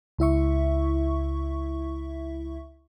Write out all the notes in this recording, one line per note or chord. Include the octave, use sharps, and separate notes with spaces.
C#2 E4 E5 C#6